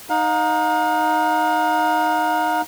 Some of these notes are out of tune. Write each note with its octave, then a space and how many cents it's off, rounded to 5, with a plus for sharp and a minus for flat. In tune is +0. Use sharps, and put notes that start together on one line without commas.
D#4 +0 F5 +40